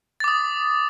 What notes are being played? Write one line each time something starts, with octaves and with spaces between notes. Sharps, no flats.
D6 D#6 A6